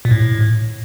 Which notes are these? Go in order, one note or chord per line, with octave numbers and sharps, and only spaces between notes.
A#2
A2